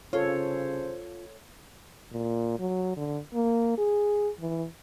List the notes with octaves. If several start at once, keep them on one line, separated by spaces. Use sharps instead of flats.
C2 C#3 F4 A4 C5 C#5
A#2
F#3
D3
A#3
G#4
E3